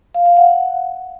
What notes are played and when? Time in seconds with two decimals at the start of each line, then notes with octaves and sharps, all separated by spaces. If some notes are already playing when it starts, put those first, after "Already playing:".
0.14 F5
0.26 F5
0.37 F#5